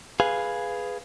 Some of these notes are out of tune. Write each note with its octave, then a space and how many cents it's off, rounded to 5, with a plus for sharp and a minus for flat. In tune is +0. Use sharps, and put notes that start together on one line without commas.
G#4 +0 B4 +0 F5 +0